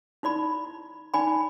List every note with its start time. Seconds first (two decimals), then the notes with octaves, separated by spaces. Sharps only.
0.23 D#4 E4 D5 B5
1.14 D#4 D5 G#5 B5